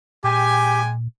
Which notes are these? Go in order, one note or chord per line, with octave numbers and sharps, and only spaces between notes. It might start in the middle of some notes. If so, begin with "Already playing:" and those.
A#2 G#3 G4 G5 G#5